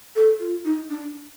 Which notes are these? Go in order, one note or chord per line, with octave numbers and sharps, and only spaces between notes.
A4
F4
D#4
D4